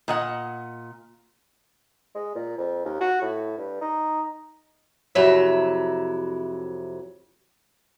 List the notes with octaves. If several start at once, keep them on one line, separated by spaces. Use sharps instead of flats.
A#2 D#5 F#5
G#3
A#2
F2
D#2
F#4
A2
G2
D#4
F2 C3 F#3 E4 E5